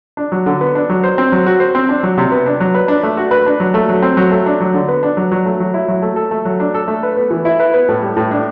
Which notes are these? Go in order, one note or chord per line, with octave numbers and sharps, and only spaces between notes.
D4
F#3
D3
B3
D4
F#3
C5
C4
F#3
F#4
C5
C4
D4
F#3
C3
B3
D4
F#3
B4
D4
A3
F#4
B4
D4
F#3
A3
F#3
C4
F#3
A3
D4
F#3
D3
B3
D4
F#3
F#3
A3
F#3
E4
F#3
A3
A4
A3
F#3
D4
A4
A3
B4
B3
E3
E4
B4
B3
A2
G3
A2
D4